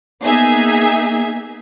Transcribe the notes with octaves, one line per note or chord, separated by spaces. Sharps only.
A#3 B3 D#4 G#4 E5 G#5